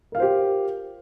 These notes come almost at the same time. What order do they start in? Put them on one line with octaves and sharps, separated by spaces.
A#4 F5 F4 C5 G4